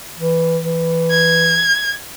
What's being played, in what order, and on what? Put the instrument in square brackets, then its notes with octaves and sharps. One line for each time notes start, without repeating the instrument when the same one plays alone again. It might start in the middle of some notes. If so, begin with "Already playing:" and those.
[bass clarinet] E3
E3
[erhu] G#6